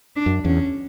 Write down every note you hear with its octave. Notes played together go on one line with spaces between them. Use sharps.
D4
F#2
E2 C#4